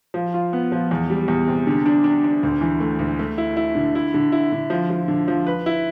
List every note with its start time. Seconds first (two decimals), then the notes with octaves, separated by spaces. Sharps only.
0.14 F3
0.34 F4
0.53 B3
0.72 F3
0.91 E2
1.10 G3
1.28 E2
1.48 C3
1.67 D3
1.86 D4
2.04 D4
2.24 D4
2.43 D2
2.61 E3
2.80 A3
2.99 D2
3.19 A3
3.38 E4
3.57 E4
3.75 D3
3.95 E4
4.14 D3
4.32 E4
4.52 D3
4.70 F3
4.90 F3
5.08 D3
5.28 F3
5.47 B4
5.66 E4